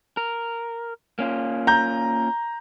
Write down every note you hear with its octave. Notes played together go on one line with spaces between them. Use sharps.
A#4
A#3 C#4 F4
A#5 G6